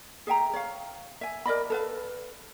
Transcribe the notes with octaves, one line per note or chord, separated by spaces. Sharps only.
G#4 E5 G5 A#5
C#5 F5
E5 G#5
A#4 D5 D#5 B5
A4 B4 F5